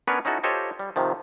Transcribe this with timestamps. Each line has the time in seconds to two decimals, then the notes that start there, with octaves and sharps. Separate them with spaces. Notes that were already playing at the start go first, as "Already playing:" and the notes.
0.07 B3 C#4 D4 A#4 B4 C#5
0.25 C#4 D#4 E4 F#4 A4
0.43 F4 G4 A4 C5 C#5 D#5
0.79 G3
0.96 C3 D#3 F3